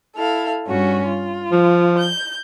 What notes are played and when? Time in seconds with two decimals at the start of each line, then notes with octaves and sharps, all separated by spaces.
0.17 E4 A4 F5
0.68 G2 C#4 F#4
1.08 F4
1.51 F3
1.97 G6